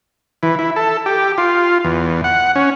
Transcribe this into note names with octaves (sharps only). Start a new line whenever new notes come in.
E3
E4
A4
G4
F4
E2
F#5
C#4